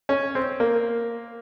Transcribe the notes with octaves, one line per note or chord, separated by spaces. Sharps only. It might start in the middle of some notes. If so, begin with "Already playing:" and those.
C#4
C4
A#3